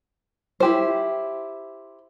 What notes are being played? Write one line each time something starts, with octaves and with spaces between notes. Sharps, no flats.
E4 G4 C5